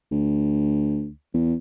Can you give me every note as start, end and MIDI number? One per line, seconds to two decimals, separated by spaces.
0.12 1.09 38
1.34 1.55 40